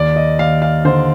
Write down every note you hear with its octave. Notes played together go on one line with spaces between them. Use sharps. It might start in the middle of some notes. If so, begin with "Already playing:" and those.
Already playing: D#2 D5
D#5
D#2 F5
F5
D3 C5